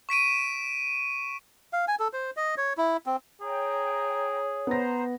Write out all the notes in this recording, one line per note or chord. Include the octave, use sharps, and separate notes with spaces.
C#6 B6 D7 D#7
F5
G#5
A4
C5
D#5
C#5
E4
C4
G#4 C#5 G5 A#5
B3 C5 A#5 A#6